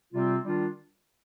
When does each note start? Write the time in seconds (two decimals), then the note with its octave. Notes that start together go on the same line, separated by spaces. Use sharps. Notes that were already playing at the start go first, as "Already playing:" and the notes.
0.13 C3 G3 C4 F4
0.44 D#3 G3 D4 F4